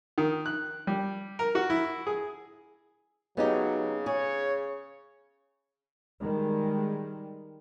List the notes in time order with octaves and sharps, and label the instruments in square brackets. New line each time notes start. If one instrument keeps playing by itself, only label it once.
[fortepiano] D#3
F#6
G3
A#4
F#4
E4
G#4
[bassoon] C#3 [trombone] F#3 [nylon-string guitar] B3 D#4 G4
[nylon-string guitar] G#4 [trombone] C#5
[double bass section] D#3 G3 G#3